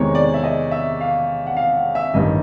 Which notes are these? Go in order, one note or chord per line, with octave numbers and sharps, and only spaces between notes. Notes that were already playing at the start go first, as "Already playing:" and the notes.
Already playing: E2 C3 D#3 G#3 C#5
D5
E5
D#5
E5
F5
F#5
F5
F#5
E5
A1 G2 D#3 D#5